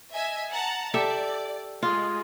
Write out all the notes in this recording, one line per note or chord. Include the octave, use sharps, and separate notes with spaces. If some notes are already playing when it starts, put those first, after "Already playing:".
D#5 E5 G#5
F#5 A5 A#5
G4 A4 D5 E5
G#3 F4